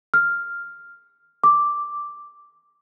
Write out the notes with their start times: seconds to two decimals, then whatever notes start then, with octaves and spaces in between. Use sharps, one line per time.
0.14 F6
1.44 D6